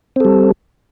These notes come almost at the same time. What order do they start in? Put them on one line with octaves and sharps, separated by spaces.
C4 A4 G3